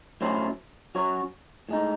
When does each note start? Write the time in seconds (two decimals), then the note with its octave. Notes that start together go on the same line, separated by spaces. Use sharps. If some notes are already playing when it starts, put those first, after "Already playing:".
0.21 A2 F#3 C#4 E4 C5
0.95 F#3 C#4 F#4 C#5
1.69 A2 G#3 D#4